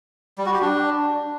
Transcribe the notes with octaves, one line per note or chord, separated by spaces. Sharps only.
G3
F#4
G4
D4